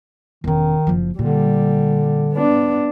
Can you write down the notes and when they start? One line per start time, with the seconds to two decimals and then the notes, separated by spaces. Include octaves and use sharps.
0.44 E1 D#3 C#4
0.87 F#1 F3
1.19 A#2 D3 G3
2.33 B3 D4